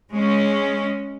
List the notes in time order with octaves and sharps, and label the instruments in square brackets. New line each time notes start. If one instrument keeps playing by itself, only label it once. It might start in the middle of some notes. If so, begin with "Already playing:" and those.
[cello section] G#3 C#4